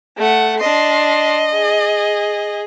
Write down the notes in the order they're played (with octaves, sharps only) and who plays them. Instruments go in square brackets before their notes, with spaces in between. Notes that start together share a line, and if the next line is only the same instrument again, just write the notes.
[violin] A3 F#5
[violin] D4 C6 [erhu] D#5
[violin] G#4